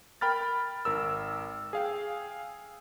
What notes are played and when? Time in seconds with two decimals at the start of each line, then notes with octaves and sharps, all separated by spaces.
0.21 A#4 G5 B5 F6 A6
0.85 G#1 A#4 E6
1.73 G#4 F5 G5